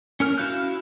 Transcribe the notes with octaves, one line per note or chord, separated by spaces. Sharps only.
C#4 A#4 F6
E4 F#4 F5 F#6 G6